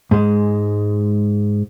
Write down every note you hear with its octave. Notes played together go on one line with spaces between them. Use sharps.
G#2 G#3